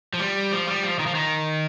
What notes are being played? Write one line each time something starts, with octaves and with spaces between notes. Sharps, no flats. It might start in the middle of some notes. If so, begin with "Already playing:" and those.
F3
G3
F3
G3
F3
D#3
F3
D#3